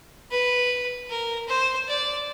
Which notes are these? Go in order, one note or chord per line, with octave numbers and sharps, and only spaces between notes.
B4
A#4
C5
D5